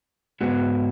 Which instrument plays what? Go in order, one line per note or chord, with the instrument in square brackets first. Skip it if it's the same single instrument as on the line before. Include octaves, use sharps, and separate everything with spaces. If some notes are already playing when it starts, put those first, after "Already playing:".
[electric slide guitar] G#2 G#3 B3 F#4